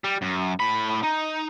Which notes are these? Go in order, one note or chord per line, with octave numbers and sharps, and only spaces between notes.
G3
F#2
A2 B5
D#4